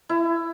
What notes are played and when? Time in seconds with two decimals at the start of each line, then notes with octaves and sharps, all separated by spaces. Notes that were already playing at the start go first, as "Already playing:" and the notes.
0.09 E4